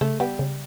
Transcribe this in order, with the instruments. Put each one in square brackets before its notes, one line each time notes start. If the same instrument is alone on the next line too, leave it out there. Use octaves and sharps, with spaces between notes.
[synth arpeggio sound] C#3 [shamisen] A3
[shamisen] G3 [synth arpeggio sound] B3
[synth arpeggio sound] C#3